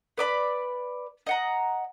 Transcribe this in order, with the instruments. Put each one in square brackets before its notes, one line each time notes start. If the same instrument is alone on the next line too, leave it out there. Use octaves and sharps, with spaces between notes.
[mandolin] B4 D5 B5
D#5 F#5 A#5